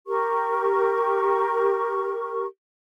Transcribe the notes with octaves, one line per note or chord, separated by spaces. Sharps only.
G4 A#4 C#6